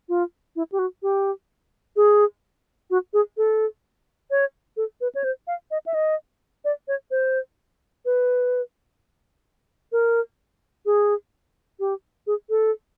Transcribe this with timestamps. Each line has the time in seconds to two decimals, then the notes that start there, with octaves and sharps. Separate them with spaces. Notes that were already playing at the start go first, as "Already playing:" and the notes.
0.09 F4
0.56 E4
0.72 G4
0.79 F#4
1.03 G4
1.96 G#4
2.90 F#4
3.13 G#4
3.37 A4
4.31 C#5
4.77 A4
5.01 B4
5.15 C#5
5.24 C5
5.47 F5
5.71 D#5
5.86 E5
5.94 D#5
6.65 D5
6.88 C#5
7.11 C5
8.05 B4
9.92 A#4
10.86 G#4
11.80 G4
12.27 G#4
12.50 A4